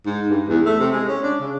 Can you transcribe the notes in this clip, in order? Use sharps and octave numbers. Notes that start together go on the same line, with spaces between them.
G#2
G2
E2
A3
C3
G#3
C#4
D4
C#3